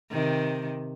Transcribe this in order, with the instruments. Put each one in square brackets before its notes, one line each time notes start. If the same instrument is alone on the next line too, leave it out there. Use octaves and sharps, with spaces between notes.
[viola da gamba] C3 D#3